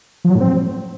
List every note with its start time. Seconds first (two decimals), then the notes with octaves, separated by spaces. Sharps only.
0.25 F3
0.30 F#3
0.35 A2
0.41 C4